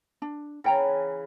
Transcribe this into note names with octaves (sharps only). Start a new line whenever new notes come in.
D4
C#3 E3 B4 F#5 G5 A#5